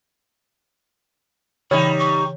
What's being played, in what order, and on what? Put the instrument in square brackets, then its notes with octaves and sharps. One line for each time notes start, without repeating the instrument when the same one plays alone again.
[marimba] C#3 E3 [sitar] G3 D#4 [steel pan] C#5 [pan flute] B5
[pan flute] C#6